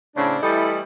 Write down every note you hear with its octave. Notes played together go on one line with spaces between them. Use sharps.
A2 C#3 C4 D4
E3 G3 A3 E4 A4 D#5